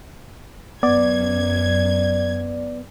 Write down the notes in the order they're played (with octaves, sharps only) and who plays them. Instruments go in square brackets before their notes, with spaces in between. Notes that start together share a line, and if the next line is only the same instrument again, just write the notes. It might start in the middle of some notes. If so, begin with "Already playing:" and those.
[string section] F#2 G#6 [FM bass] B3 [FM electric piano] D5